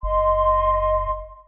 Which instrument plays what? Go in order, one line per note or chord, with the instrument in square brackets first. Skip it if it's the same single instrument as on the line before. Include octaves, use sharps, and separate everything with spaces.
[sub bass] F#1 [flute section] D#5 C6